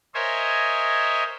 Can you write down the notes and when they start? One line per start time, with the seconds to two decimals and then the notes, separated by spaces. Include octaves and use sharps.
0.14 A#4 C5 C#5 D#5 E5 G#5